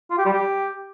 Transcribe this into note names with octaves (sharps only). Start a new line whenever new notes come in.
F4
G4
G3
G4